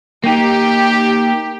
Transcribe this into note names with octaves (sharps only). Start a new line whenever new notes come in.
A#3 D#4 G4